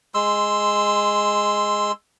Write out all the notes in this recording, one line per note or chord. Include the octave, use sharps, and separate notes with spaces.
G#3 C6 E6